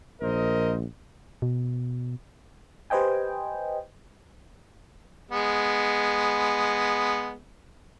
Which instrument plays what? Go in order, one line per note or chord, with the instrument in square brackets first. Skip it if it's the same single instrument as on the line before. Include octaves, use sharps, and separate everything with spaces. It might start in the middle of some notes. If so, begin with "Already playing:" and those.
[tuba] A#1 [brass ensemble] A#4 C5 D#5
[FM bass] B2
[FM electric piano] G4 B4 C5 D#5 G5 G#5
[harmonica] G#3 B3